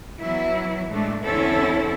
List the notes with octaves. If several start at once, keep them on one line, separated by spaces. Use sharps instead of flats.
E3 F#3 B3 E4
A2 G#3 A3 D4
E2 D3 C4 C#4 E4 A4